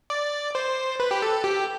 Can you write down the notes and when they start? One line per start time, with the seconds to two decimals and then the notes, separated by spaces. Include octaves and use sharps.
0.10 D5
0.55 C5
1.00 B4
1.11 G4
1.22 A4
1.44 G4